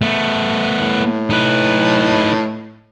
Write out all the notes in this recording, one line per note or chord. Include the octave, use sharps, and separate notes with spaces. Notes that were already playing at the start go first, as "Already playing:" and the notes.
A3 B3
A2
D#4 B4